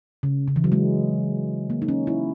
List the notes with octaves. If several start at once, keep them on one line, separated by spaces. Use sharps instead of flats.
C#3
C#3
E3
F#3
G#3
A#3
D#4
C#4
E4